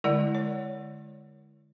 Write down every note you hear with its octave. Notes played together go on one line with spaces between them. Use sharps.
D3 G#3 E4 A#4 D5 F#5
C#5